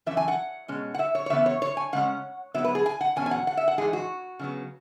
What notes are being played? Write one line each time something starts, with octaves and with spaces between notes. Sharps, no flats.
F#2 E3 C#4 E5
G#5
F#5
B2 G#3 C#4
F#5
E5
C#5
C#5
C#3 E3 B3 E5
C#5
C#5
G#5
C#3 G#3 C#4 F#5
G#2 F#3 B3 E5
B4
G#4
G#5
F#5
E2 B2 F#3 C#4 G#5
G#5
F#5
F#5
E5
F#5
G#2 E3 G#3 G#4
F#4
C#3 F#3 B3